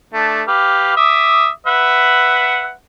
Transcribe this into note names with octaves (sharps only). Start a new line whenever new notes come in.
A3 D4
G4 B4 F5
E5 D6 D#6
B4 E5 F#5